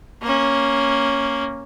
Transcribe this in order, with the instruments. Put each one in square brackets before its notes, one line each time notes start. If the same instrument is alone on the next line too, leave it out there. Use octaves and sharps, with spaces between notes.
[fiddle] A#3 C#4